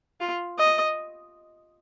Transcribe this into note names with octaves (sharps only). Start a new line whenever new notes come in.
F4
D#5